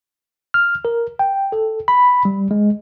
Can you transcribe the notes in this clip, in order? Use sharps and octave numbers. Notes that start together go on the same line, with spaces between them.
F6
A#4
G5
A4
B5
G3
G#3